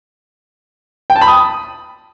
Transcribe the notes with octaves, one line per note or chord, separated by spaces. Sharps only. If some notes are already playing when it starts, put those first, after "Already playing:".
G5
A5
B5
D#6